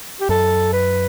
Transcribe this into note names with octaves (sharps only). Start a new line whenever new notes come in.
G4
F#2 A4
B4